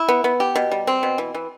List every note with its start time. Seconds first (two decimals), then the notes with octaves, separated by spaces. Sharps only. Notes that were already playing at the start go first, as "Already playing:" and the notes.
Already playing: E4
0.09 B3
0.24 B3
0.40 G4
0.55 B2
0.72 G3
0.87 C4
1.03 B2
1.18 E3
1.34 E3